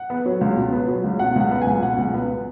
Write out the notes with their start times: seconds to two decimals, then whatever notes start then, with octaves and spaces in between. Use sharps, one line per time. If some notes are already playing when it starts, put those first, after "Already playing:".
Already playing: F#5
0.10 B3
0.26 F#3
0.41 C#2
0.56 B2
0.73 B3
0.88 F#3
1.04 C#2
1.19 B2 F#5
1.36 C#2 F#5
1.51 B3
1.62 G#5
1.66 C#2
1.83 B2 F#5
1.98 C#2
2.14 B3